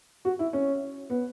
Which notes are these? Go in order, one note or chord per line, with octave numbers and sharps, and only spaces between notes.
F#4
E4
C#4
B3